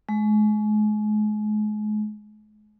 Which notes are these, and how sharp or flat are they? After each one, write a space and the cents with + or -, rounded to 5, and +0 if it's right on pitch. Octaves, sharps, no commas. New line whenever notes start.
G#3 +35